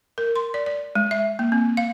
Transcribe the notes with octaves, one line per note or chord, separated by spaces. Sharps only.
A#4
C6
D5
D5
G#3
E5
A#3
C4
F5